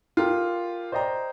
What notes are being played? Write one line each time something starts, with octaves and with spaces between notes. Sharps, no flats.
F4 G4 A4 A#4
C5 D5 D#5 G5 A#5